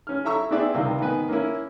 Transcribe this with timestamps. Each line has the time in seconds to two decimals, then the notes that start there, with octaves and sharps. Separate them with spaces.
0.07 C#4 F6
0.24 E4 A4 E5 A#5 C#6 E6
0.51 B3 C4 E4 G#4 D5 E5
0.75 C#2 C3 D#3 G3 C4
1.00 G#2 D#3 B3 B4 G#5
1.29 A#3 C#4 E4